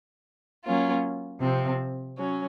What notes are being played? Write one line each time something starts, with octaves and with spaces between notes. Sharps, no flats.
F#3 A#3 C#4 F4
C3 F3 C4
F#3 C#4